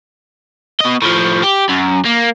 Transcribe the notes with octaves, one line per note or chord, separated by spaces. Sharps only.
B2 D#5
A2 F3
G4
F#2
A#3